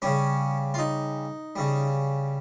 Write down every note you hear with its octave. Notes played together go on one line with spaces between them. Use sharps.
C#3 G3 C#4
F4
D#4
C#3 G3